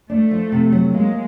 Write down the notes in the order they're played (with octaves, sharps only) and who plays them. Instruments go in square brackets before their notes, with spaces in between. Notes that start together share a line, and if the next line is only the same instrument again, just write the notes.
[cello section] A3 [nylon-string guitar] D4
[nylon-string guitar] F3
C3
F#3
[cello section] G#3 [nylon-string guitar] A#3